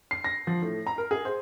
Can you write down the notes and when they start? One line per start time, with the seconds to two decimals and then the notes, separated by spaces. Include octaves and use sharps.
0.11 C7
0.24 A#6
0.47 F3
0.62 A2
0.87 A#5
0.98 A#4
1.11 G#4
1.25 C5